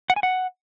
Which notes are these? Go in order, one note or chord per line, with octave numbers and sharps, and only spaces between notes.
F#5
G#5
F#5